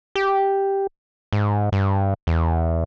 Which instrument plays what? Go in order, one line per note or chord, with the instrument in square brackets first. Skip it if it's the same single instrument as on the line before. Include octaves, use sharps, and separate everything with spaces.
[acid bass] G4
G#2
G2
E2